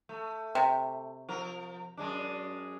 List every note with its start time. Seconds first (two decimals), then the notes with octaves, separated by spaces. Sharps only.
0.09 A3
0.55 C3
1.29 F3 A#4
1.97 F#2 G#3 D4